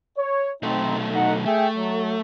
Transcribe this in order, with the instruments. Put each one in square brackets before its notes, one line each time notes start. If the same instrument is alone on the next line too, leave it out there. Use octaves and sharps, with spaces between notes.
[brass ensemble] C#5
[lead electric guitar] B1 A3 [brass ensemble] C4 D#4
[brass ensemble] D#4 F#5
[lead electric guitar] A3 [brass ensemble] G#4 E5 G5
[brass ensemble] F#3